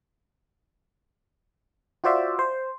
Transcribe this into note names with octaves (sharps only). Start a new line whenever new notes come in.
F4 F#4 C5 D5 E5 F5
C5